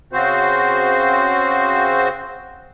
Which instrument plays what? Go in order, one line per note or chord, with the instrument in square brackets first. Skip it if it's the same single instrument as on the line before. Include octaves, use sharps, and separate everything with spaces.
[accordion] C#3 C4 F#4 C5